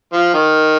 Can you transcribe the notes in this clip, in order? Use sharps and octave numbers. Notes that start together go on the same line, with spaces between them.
F3
D#3